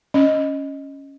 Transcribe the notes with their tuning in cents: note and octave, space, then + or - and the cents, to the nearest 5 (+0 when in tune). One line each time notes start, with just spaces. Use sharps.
C#4 +0 D#5 +0